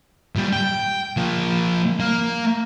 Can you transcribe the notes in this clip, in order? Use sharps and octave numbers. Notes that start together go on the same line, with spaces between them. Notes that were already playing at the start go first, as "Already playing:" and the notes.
A#2 G3
G5
F3 A#3
A#3